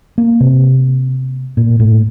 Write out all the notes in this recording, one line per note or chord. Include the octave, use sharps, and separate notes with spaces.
A#3
C3
A#2
A2